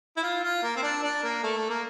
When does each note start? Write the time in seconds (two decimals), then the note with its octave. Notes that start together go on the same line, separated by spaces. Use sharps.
0.17 E4
0.23 F4
0.43 F4
0.63 A#3
0.76 C4
0.83 D4
1.03 D4
1.23 A#3
1.43 A3
1.57 A3
1.70 A#3